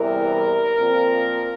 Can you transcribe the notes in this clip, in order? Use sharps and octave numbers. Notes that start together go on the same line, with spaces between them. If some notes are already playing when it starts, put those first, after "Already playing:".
Already playing: E2 C3 E3 G3 A#4
A#2 F3 C4